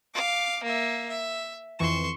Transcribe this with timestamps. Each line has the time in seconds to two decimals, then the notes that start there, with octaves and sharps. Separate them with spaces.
0.14 F5 D6
0.64 A#3 E5
1.09 E5
1.79 F2 E3 C6 C#6 E7